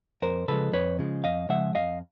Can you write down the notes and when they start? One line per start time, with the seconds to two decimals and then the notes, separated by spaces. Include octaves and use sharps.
0.22 F2 A#4 C5
0.48 C#3 F3 G#3 A4 B4
0.73 F2 B4 C#5
0.99 C#3 F3 G#3
1.24 F2 D#5 F5
1.49 C#3 F3 G#3 E5 F#5
1.75 F2 D#5 F5